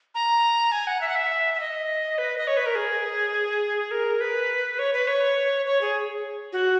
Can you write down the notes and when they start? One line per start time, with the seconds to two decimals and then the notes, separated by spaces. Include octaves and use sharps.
0.15 A#5
0.72 G#5
0.87 F#5
1.01 E5
1.09 F#5
1.15 E5
1.54 E5
1.60 D#5
2.18 B4
2.38 D#5
2.47 C#5
2.57 B4
2.66 A#4
2.75 G#4
3.91 A#4
4.21 B4
4.79 C#5
4.93 B4
5.07 C#5
5.66 C#5
5.81 G#4
6.53 F#4